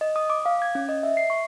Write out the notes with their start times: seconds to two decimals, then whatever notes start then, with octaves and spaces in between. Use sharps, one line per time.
0.01 D#5
0.16 D#6
0.30 D6
0.46 F5
0.62 G#6
0.75 C#4
0.89 D#5
1.03 E5
1.17 C7
1.30 C#6